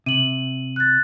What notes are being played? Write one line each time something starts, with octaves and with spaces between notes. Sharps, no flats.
C3 D#7 F#7
F#6 A6